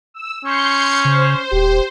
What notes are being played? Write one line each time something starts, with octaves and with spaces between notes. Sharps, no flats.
E6
C#4 C6 G6 C#7
C#3 C5
D#1 G4